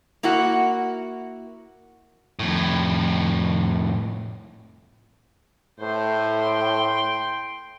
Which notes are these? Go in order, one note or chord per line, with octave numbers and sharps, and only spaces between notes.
A#3 E4 F#4 A#4 F#5
F2 A2
A2 C5
G5 C6